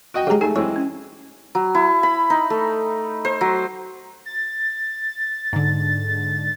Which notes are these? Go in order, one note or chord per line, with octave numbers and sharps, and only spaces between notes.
F#4 D#5 G5
C#3 G#3 G4 A#5
A3 D#4 G#4 A4 G#5
E3 G#3 C4 C#5
C#4
F#3
E4
B5
D#4
A3
C5
F#3
A6
G#2 D3